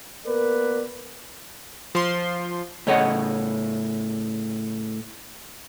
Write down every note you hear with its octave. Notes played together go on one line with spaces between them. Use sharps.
A#3 B3 A#4 B4 D5
F3 C6
A2 C#3 C#5 D#5 F#5